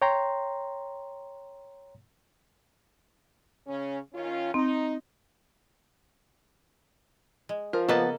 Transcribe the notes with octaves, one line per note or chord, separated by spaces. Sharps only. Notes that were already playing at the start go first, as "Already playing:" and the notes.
C#5 G5 A#5 C6
C#3 C#4
D#3 C#4 F4
C4 D#4
G#3
F3 A#4
C#3 A#3 B3 A4 B4 D#5 A6